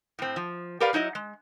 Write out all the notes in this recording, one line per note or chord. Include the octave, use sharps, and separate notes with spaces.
A2 C4
F3
G4 A#4 B4 D5 F5
F#3 D#4 E4 D#5
G#3